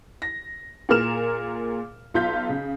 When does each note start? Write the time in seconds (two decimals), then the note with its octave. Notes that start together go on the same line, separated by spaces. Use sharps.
0.22 A#6
0.89 A#2 G#4 A#4 F6 E7
2.14 B1 F4 G6 B6
2.49 C#3